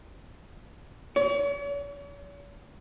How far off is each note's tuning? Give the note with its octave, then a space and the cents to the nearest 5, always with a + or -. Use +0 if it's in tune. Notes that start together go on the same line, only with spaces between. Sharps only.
C#5 +45